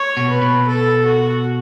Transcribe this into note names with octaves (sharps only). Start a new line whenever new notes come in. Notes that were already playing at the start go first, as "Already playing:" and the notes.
Already playing: C#5
B2
B4
B2
A4
F#4